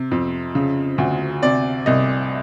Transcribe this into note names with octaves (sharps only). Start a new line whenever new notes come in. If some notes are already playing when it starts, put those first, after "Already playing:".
Already playing: C3
F2
C#3
D2
C3 D5
C2 D#5